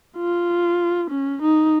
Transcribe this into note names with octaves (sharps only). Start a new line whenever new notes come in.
F4
C#4
D#4